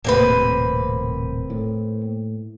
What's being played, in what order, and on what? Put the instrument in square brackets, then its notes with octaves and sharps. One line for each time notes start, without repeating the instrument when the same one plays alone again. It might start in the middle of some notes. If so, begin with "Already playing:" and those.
[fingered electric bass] D#1 A2 C3 [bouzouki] A#3 C4 B4
[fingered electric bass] A2